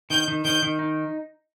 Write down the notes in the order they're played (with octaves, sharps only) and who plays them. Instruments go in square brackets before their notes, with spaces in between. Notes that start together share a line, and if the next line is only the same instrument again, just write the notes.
[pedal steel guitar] D#3 [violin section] G6
[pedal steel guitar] D#3
[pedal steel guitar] D#3 [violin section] G6
[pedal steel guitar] D#3
D#4